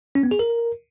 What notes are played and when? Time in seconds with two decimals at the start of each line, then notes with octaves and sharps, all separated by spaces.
0.15 C#4
0.23 B3
0.31 G#4
0.39 A#4